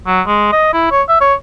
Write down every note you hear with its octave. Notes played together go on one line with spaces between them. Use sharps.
F#3
G#3
D#5
E4
C#5
E5
C#5